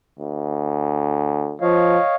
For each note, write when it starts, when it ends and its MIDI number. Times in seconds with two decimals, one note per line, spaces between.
0.19 1.56 38
1.61 1.97 53
1.61 2.16 73
1.61 2.16 75
1.61 2.16 77